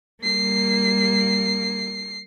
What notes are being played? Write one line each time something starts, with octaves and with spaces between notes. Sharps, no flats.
G3 A#3 C7